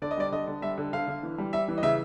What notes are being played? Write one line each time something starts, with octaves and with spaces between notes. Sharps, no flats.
D3 D5
D#5
G3 D5
D3 D#5
D3
G3 E5
D3
D3 F5
D3
E3
G3
G3 E5
E3
D#5
C#3 E5